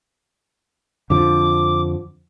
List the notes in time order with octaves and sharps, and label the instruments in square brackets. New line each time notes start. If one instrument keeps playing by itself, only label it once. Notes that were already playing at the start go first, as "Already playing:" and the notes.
[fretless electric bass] F2 D3 F3 [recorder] D6